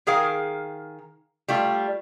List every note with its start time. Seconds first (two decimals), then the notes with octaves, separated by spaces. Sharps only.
0.07 D#3 G#4 A#4 F5
1.48 G3 A3 F4